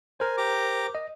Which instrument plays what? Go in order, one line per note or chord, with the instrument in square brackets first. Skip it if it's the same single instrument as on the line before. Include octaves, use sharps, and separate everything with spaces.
[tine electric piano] A#4 C5 [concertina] G#5
[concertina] G4 A#5 D6
[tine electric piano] D#5